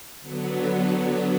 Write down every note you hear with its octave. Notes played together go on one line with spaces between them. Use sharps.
D3 F#3 B3